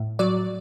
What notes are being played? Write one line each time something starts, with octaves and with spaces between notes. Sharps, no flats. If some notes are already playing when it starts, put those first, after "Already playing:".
Already playing: A2
F#3 D5